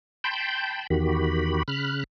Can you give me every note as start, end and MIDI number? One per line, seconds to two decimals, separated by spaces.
0.24 0.87 79
0.24 0.87 81
0.24 0.87 83
0.24 0.87 84
0.24 0.87 91
0.90 1.63 40
0.90 1.63 51
0.90 1.63 66
0.90 1.63 67
0.90 1.63 83
1.68 2.04 49
1.68 2.04 83
1.68 2.04 89
1.68 2.04 90